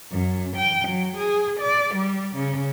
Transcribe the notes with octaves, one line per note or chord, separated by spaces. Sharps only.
F#2
G5
F#3
G#4
D5
G3
C#3